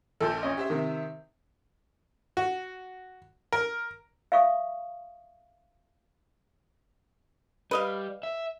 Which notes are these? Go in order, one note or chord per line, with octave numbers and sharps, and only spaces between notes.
A#1 A#2 A4 G6
C#4 D#5
G4 C5 E5
C3 D#3
F#4
A#4
E5 F5 C#6 D#6
G3 B4 D#5 F5
E5